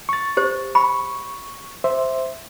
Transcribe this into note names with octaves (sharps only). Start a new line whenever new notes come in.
C#6 A6
G4 C5
B5 C#6
C5 E5